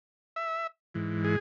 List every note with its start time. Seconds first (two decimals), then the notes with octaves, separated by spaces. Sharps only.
0.36 E5
0.94 G#2 E3
1.24 G#4